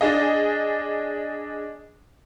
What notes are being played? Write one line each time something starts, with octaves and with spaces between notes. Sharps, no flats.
D4 G#4 D#5